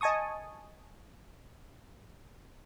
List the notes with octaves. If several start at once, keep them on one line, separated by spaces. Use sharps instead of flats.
D#5 G#5 A5 C#6 D#6